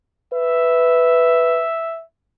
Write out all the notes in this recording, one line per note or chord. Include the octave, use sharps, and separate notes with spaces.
B4 E5